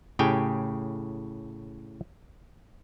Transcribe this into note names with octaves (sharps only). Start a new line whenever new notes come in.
A2 C#3 G4 G5 G#5